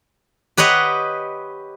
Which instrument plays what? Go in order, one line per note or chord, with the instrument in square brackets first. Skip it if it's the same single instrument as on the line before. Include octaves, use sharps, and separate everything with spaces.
[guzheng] G4 B4 C#5 D#5 F#5